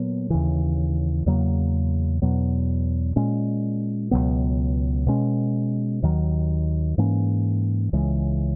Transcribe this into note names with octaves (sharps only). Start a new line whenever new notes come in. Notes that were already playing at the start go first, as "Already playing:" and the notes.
Already playing: A#2 F#3 B3
D#2 C#3 E3
E2 C#3 F#3 A#3
E2 B2 F#3 B3
A#2 G#3 C#4
C#2 B2 F#3 B3
B2 G#3 C#4
D#2 D#3 F#3
G#2 E3 A#3 C#4
C#2 C#3 E3 G#3